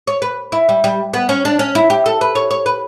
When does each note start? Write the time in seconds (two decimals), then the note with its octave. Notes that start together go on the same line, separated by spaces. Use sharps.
0.07 C#5
0.22 B4
0.52 E4
0.69 G3
0.84 G3
1.13 B3
1.29 C#4
1.45 D4
1.59 C#4
1.75 E4
1.90 G4
2.06 A4
2.21 B4
2.35 C#5
2.51 C#5
2.66 B4